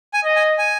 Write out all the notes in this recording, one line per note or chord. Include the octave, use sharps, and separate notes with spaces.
G#5
D#5
G#5
G#5